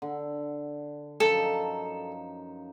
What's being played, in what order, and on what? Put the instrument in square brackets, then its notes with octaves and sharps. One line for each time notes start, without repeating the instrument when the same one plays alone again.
[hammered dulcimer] D3
[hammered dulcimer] F#2 F3 D#4 [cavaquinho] A4